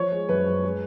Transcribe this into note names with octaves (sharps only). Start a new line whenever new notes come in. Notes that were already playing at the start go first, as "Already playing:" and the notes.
Already playing: F3 C#5
G#3
F#2 B4
F#2
G#3